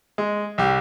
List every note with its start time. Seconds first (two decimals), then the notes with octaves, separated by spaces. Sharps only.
0.18 G#3
0.58 C2 G4